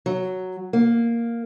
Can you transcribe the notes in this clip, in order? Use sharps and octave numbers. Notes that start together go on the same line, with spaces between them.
F#3
A#3